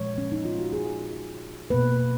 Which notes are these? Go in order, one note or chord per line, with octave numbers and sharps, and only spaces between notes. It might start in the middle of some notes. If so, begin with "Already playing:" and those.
Already playing: A#2 F3 G#3 C#5
C#4
D#4
F4
F#4
G#4
B2 A#3 B4